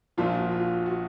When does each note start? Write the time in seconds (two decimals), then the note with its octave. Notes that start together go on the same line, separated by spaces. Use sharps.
0.18 A#1 A#2 F3 F4
0.35 F#4
0.52 F4
0.86 F#4